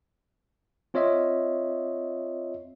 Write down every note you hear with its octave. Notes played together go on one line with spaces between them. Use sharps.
C4 F4 C#5 D#5 E5